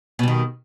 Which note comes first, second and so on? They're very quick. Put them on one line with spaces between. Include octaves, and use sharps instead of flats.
B2 G3 D#3